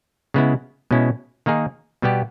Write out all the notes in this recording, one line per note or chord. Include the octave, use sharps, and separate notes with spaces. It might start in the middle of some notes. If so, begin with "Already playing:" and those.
C#3 G#3 B3 E4
B2 G#3 C#4 E4
D#3 A#3 D#4 G#4
B2 G3 B3 G4